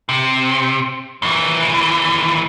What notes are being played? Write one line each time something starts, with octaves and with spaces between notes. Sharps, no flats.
C3
D#2 E3